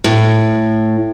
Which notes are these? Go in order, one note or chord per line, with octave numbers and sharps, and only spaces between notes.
A2